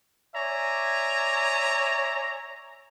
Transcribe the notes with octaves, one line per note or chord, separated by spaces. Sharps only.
C#5 D5 E5 G#5 A#5